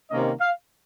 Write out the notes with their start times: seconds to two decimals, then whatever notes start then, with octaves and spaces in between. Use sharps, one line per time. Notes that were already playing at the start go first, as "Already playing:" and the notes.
0.11 C3 D#3 A#3 C#4 D#5
0.41 F5